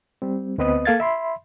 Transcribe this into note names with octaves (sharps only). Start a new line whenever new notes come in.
G3 C4
D2 B3 C4 B4 D#5 D#6
A#3 A4 F5 G#6 A6
E5 B5 C6